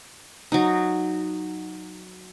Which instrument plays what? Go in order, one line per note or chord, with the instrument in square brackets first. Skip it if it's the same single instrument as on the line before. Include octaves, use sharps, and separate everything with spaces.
[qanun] F#3 D#4